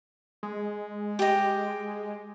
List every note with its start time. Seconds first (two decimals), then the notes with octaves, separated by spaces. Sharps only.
0.43 G#3
1.19 G4 D#5